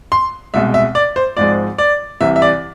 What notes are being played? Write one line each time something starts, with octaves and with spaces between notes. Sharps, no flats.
C6
C2 B2 G#3 E5
E5
D5
C5
G#1 G#2 F3 G#3 D5
D5
C2 C3 E3 E5
E5
D5